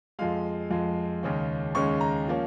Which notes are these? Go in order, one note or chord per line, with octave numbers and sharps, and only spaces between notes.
F2 F3 G#3 F5
F2 F3 G#3
D#2 C#3 G#3 C#4
D#2 C#3 G#3 C#4 C#6
A#5
F3 A#3 C#4